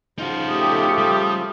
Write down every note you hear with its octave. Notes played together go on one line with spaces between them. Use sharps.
C#3 F3 D#4 F4 F#4
A3 G4 D#6
G3